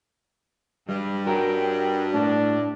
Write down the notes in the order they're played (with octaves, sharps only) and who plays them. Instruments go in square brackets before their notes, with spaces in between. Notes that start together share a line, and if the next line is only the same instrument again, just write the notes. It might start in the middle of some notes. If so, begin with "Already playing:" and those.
[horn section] G2 [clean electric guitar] G3
[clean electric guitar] F#4 A#4 [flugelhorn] G5
[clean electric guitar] A2 [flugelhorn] D4